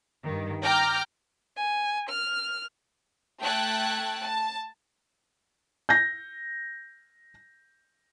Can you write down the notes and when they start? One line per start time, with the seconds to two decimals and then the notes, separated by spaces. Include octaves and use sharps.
0.23 G2 D#3
0.62 G5 A#5 D6 F6 G6
1.57 G#5
2.09 F6
3.41 A3 G5 A5 F#6 G#6
4.21 A5
5.89 G6 A#6